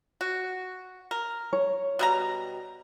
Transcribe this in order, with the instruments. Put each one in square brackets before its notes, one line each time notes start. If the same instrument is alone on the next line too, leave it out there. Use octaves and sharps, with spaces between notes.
[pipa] F#4
A#4
[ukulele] C#5
[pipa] B2 G3 A#5